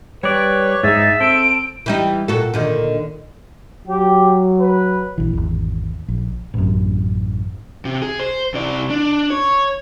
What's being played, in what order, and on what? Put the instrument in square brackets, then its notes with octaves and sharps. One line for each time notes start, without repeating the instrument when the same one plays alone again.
[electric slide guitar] G3 D5 [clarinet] B4 [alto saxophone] C#5
[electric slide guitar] G#2 D#4 [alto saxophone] G#4 [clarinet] E5 [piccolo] A6
[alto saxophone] C4 [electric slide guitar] A4 [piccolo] D7
[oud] E3 G3 D#4
A#2 F#4 A4
A#2 D3 D#3
[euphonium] F#3 [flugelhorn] G4
[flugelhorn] B4
[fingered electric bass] A#1 E3
G#1 E2
A#1
[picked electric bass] A1 F#2
[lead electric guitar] C3
G#4
C5
C3 D5
D4
C#5